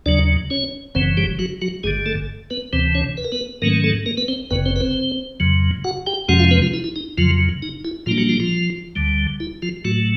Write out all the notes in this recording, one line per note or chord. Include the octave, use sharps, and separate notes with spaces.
D#2 C#3 F#3 D4 D5
C#4 C#5
F#1 F#2 C#3 E3 C4 C5
G3 G4
F#3 F#4
F#3 F#4
G#1 G2 D3 G#3 G#4
A3 A4
B3 B4
D2 C3 E3 C4 C5
C#4 C#5
B4
A#4
B3 B4
G#2 D#3 F#3 A3 A#3 C#4 A#4
A3 A4
A#3 A#4
B3 B4
C4 C5
G1 F#2 C#3 B3 B4
C4 C5
B4
C4 C5
F2 C#3 F#3
F#4 F#5
G4 G5
F2 C3 F3 G#3 C#4 F#4 F#5
F4 F5
B3 B4
F3 F4
E4
E4
D#4
F2 C#3 F3 F#3 F4
D#4
E4
A#2 F3 G3 A#3 D4 F4
F#3 F#4
F3 F4
F3 F4
D2 D3 G3
E4
F3 F4
A2 F#3 A3 F#4